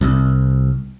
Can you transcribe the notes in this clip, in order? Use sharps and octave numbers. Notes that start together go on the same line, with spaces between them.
C2